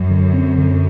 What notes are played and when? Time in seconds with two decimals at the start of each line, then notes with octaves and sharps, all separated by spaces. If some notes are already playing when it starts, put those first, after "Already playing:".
Already playing: F#2 F#3
0.10 D3
0.33 C4
0.58 D3